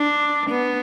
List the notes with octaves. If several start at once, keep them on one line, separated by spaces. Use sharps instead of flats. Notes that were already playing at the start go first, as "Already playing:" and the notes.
Already playing: D4
B3